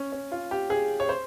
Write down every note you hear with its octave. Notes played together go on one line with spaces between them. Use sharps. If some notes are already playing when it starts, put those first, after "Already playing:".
Already playing: C#4
C#4
F4
G4
G#4
C#5
C5